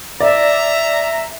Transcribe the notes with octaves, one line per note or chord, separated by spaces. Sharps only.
D5 E5 A#5